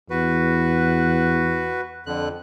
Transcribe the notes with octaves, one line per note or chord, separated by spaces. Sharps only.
E2 F#4 B4
F2 D3 F#6